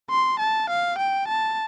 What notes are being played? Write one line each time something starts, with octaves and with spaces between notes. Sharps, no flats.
C6
A5
F5
G5
A5